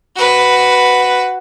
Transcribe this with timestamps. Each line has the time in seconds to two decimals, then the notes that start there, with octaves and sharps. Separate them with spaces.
0.16 F#4 B4